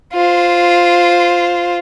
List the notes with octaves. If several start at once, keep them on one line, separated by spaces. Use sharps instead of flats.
F4 C5